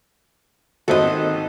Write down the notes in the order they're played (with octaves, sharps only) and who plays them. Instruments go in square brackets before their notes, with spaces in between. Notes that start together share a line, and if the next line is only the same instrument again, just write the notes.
[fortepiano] G#1 C4 F#4 [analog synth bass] D#3 [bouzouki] A4 D#5